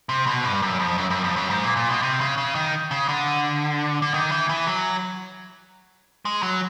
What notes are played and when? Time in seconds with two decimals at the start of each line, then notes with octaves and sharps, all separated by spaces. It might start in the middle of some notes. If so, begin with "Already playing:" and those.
0.09 C3
0.26 B2
0.44 G2
0.62 F#2
0.80 F2
0.98 F#2
1.10 F#2
1.24 F2
1.36 F#2
1.50 G#2
1.64 A#2
1.77 A#2
1.90 B2
2.02 C3
2.21 C#3
2.38 C#3
2.55 D#3
2.91 C#3
3.08 D3
4.02 D3
4.14 D#3
4.31 E3
4.49 E3
4.67 F#3
6.25 G#3
6.43 F#3